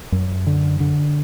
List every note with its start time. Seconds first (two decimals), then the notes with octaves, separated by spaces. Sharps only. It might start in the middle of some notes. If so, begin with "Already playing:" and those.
0.12 F#2
0.47 D3
0.80 D3